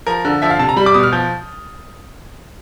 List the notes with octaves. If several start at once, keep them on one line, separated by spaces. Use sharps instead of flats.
F3 A#4
D3
F3 E5
F5
C3 A5
A#5
G3 B5
D6
B2 D#6
F6
F3 G6